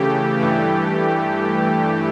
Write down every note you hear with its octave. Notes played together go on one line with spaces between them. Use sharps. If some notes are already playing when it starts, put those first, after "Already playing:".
Already playing: C#3 E3 A3 G4
G2 E3 A3